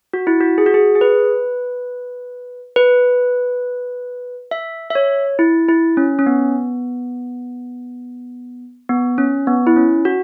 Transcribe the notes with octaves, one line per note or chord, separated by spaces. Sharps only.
F#4
E4
F#4
G#4
F#4
G#4
G#4
B4
B4
E5
E5
C#5
E4
E4
C#4
C#4
B3
B3
C#4
B3
E4
C#4
F#4